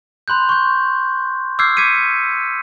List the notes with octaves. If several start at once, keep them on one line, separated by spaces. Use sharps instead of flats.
B5 C6 F#6 G6
C#6 G6
D6 E6 F6 G6 G#6 C7
D6 G#6 B6 C#7 D#7